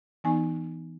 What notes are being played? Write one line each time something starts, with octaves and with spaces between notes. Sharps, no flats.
E3 B3 D#4 G#5